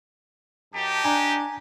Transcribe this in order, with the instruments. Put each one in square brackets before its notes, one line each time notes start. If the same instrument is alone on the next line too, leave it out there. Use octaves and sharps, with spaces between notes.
[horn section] F#2 A5 [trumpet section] D#4 G4
[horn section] D4 [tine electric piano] G#5 A#5